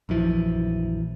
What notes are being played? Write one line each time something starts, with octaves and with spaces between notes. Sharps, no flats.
A#1 F#2 E3 F3